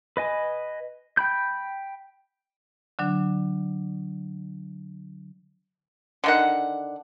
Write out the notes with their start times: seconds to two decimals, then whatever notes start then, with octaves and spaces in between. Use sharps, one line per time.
0.17 B4 D#5 G#5
1.17 G5 B5 G6
2.99 D3 F#3 D4
6.24 D3 D#3 F#5